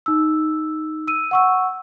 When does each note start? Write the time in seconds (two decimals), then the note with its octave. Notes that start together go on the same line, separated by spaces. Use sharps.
0.06 D#4 E6
1.07 E6 D#7
1.31 F#5 C#6 E6